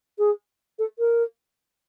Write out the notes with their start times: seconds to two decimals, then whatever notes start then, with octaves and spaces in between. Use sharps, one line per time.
0.18 G#4
0.79 A4
0.99 A#4